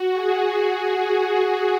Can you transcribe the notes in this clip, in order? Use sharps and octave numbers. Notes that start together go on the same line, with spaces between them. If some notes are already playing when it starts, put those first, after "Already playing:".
Already playing: F#4
G#4